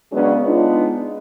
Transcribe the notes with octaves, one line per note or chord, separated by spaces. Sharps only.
C#3 F#3 G#3 B3 C#4 D4
G#3 B3 D4 D#4 F4